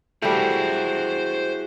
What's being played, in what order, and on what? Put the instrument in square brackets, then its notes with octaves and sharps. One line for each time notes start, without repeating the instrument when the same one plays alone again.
[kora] G3 A3 [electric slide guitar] E4 F#4 G#4 [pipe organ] C5